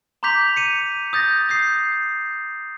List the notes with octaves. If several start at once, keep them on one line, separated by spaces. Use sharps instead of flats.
A#5 C6 D6 G6 B6 F7
C#7 D#7
D#6 G6 A6 A#6
D#6 G6 C7